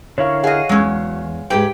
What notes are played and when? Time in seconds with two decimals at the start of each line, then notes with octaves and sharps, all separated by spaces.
0.18 D3 E4 A#4 C#5 F5
0.44 G#4 D#5 F5 F#5
0.69 E2 F#3 G#3 C#4
1.50 G#2 G4 G#4 B4 G5